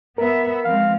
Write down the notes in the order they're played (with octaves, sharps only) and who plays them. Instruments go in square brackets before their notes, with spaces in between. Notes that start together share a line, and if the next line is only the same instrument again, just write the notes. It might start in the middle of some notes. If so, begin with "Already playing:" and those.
[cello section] B3 E5 [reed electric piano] A#4
[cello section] F3 G#3 C4 [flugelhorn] F5